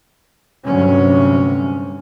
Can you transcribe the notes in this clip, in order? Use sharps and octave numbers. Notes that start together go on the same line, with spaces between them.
D2 G2 C3 F#3 C#4